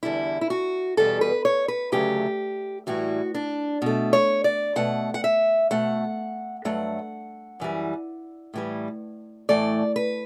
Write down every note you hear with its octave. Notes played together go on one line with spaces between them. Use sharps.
E2 D3 G3 E4
E4
F#4
E2 B2 G3 A4
B4
C#5
B4
D2 C#3 F#3 A3 G4
A2 E3 G3 F#4
D4
B2 A3
C#5
D5
B2 A3 F#5
F#5
E5
B2 A3 F#5
G2 F#3 A3 F#5
F#2 E3 G3
A2 E3 G3
A2 E3 A3 D5
B4